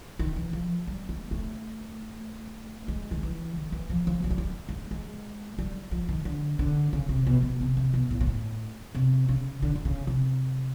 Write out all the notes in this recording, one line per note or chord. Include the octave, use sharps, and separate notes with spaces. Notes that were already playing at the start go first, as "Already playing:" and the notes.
D#3
E3
F3
G3
G#3
A3
G#3
D#3
E3
D#3
E3
F3
F3
G3
F#3
G3
G#3
G#3
G3
F3
D#3
D3
D3
C#3
C3
B2
B2
C3
C3
B2
A2
A#2
A2
C3
C#3
D3
D3
C#3
C3